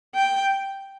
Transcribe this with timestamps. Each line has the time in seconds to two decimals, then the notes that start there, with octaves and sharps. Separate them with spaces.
0.15 G5